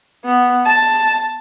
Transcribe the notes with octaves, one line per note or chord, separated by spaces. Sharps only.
B3
A5